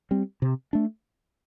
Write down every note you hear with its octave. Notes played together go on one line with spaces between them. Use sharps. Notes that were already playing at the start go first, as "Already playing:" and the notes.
G3 C4
C3
A3 D4